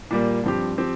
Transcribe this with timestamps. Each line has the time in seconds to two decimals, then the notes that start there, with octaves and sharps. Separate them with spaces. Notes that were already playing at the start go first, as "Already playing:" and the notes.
0.11 A#2 G3 A#3
0.44 G2 F3 C4 G4
0.77 F3 C4 G4